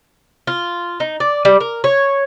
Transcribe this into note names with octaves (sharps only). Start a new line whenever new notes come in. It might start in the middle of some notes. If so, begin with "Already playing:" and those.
F4
D#4
D5
G3
A#4
C#5